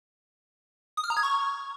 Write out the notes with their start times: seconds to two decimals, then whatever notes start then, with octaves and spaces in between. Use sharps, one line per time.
0.97 D#6
1.04 F6
1.10 A#5
1.17 G#6
1.23 C#6